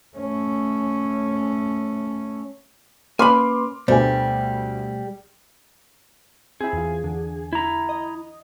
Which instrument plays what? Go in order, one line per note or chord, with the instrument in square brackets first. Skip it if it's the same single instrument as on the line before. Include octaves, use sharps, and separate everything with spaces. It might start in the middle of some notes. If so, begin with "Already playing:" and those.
[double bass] A3 C#4
[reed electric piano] A#3 C#4 B4 [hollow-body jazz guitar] G#5 B5 [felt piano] C6 D6 F6
[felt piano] D2 [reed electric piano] B2 A3 [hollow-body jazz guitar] G3 [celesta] C5 G#5
[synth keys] C4 E4 [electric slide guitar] G#4
[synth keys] E2 F4
E2 D3
[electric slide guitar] E4 A#5
[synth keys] D#5